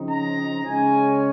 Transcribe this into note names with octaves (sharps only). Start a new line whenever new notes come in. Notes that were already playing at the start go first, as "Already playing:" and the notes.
Already playing: C#3 F3 C4 D#4
A#5
C#3 G#3 C#4 G#5